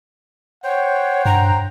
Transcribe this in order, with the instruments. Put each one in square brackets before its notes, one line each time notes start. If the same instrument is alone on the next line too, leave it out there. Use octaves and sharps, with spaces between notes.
[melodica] C5 G5 [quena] C#5 [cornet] F#5
[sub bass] G2 [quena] A#5